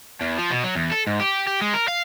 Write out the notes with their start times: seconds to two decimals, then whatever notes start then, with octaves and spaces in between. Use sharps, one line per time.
0.21 E2
0.38 F3
0.51 B2
0.64 F#3
0.75 E2
0.92 A4
1.07 G#2
1.20 G4
1.47 G4
1.61 G#3
1.74 A#4
1.88 F5